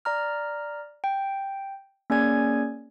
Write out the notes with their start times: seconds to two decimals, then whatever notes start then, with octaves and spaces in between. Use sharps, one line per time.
0.05 D5 A#5 F6
1.04 G5
2.10 A#3 C#4 G#4 D5 G#5 G#6